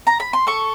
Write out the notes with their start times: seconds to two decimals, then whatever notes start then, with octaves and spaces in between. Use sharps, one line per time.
0.07 A#5
0.20 B5
0.33 C6
0.47 A4 C#6